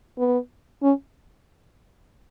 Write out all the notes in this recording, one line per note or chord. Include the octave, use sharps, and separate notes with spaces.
B3
C#4